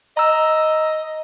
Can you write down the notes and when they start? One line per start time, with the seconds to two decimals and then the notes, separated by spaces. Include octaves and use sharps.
0.17 D#5 A#5 E6